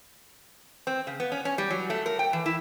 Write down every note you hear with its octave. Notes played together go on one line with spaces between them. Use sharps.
C4
C#3
B3
C#4
C#4
G3
F#3
A3
A#4
G5
E3
E4